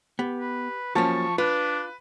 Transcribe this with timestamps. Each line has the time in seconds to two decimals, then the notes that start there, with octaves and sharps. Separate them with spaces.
0.19 B3 G4
0.40 B4
0.95 F3 F#3 A#3 C#4 A5 C#6
1.38 D4 F4 B4